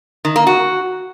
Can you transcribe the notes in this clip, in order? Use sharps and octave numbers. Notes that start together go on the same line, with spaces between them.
D#3
A#3
F#4